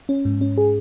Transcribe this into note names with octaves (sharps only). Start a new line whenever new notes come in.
C#4
G#2
C#4
G#4